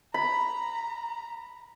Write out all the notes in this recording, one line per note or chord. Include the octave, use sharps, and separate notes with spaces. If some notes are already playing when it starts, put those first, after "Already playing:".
A#5 B5